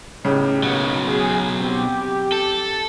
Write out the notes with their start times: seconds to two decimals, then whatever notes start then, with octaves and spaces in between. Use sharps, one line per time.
0.25 A2 C#3 B3 D#4 G4
0.63 B1 F#3 A#3 B3 F#4
1.07 G#4
1.60 C4 G4
2.32 A4